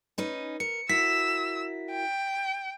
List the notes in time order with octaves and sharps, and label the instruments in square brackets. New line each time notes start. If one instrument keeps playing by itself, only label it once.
[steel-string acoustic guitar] C#4 D#4 B4
[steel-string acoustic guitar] A#4 [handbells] C#7
[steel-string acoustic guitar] E4 F#4 A#4 [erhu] E6 [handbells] B6
[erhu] G5